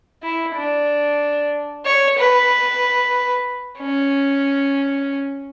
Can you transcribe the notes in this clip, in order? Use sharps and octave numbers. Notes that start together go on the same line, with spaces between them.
E4
D4
C#5
B4
C#4